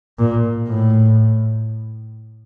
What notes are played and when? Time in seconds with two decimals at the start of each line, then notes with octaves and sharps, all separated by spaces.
0.19 A#2
0.69 A2